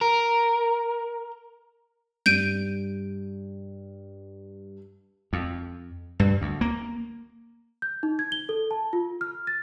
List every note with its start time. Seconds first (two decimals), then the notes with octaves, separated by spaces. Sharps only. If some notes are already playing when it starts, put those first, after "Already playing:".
0.01 A#4
2.26 G2 G6 D7 D#7
5.33 F2
6.20 G2
6.41 D2
6.61 A#3
7.82 G6
8.03 D#4
8.19 G#6
8.32 G7
8.49 A4
8.71 A5
8.93 F4
9.21 F6
9.47 A6